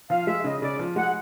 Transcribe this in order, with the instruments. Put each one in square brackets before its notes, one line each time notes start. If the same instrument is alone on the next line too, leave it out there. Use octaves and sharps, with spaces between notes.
[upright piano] F3 [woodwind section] F5
[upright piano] G#3 [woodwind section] E5
[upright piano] C#3 [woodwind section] D#5
[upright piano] C#3 [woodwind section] D5
[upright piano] F3
[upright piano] G#3 [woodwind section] F#5